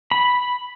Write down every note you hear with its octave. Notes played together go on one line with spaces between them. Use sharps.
B5